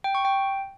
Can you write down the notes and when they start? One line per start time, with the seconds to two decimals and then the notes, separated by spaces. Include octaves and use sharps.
0.04 G5
0.15 C#6
0.25 G5